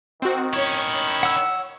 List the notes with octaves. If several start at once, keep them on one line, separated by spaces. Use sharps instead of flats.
D#3 C4 F#4
C#4 E4 C#5
F#5 E6